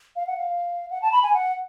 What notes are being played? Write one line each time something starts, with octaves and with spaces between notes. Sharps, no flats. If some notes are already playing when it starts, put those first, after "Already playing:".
F5
F#5
F5
F#5
A5
B5
G#5
F#5